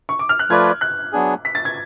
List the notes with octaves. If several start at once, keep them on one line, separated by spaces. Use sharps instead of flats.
C#6
D6
F6
F#6
F3 A3 F4 B4 D5 G#6
F#6
F#3 B3 D4 G#4
B6
A6
G#6